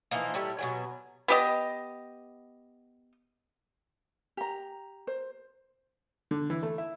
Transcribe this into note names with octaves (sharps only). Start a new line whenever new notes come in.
E3 F3 A#3 D#4
A2 G3 E4
B2 F#3 G#5
B3 G4 D#5
G4 A#5
C5
D3
E3
A3
E4